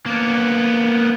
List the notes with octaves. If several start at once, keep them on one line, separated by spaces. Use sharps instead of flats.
A#3 B3